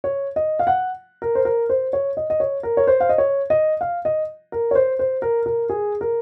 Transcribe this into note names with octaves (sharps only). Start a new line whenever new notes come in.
C#5
D#5
F5
F#5
A#4
C5
A#4
C5
C#5
D#5
D#5
C#5
A#4
C#5
C5
F5
D#5
C#5
D#5
F5
D#5
A#4
C#5
C5
C5
A#4
A#4
G#4
A#4